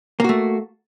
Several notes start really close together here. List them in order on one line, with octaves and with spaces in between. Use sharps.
A#3 F#4 A3